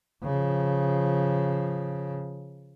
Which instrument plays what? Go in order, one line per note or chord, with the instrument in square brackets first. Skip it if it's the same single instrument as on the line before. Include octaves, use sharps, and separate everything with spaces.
[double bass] C#3 F3